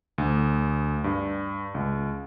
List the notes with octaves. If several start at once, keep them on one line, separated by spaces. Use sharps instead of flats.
D2
G2
C#2